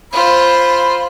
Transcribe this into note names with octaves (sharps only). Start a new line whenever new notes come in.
F4 C5 B5